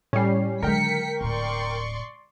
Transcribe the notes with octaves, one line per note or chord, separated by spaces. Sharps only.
A2 G3 C#4 C7
D3 D#3 F#3 G#3 A#4 G5 B6 C#7
D1 A2 D5 C6 C#6